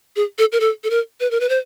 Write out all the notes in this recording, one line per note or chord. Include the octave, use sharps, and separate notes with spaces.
G#4
A4
A#4
A4
A4
A#4
B4
A#4
B4
C5